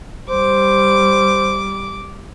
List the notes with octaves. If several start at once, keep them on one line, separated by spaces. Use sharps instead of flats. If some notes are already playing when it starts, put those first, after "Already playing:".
G3 C5 D6